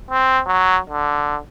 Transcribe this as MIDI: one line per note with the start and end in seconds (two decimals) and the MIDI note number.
0.10 0.40 60
0.46 0.78 54
0.90 1.37 50